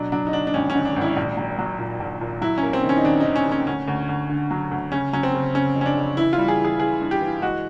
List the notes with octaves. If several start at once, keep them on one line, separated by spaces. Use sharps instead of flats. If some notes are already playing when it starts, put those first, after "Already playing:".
Already playing: B2 F#3 D4
F#3 D4
D#4
D3 D4
D4
G#1 C#4
C#4
D3
D4
G#1
E4
A#1
F#3
F#3
A#2
A#1
A#2
F#3 E4
A#3 C#4
C4
D#3
C#4
D#4
D#2 D4
D#4
D#3
C#4
D#3
C#4
D2 C#4
D2
D2
D3
F#3
D2
C#3 C#4
F#3 C#4
C4
C#3
C#3 C#4
F2
C#4
D4
C#3
E3 E4
F4
G3
G#4
E3
G#4
E3 G#4
G2
G4
E3
G#3 F#4